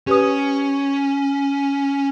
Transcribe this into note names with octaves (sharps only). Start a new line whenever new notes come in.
C#4 G4 B4 D#6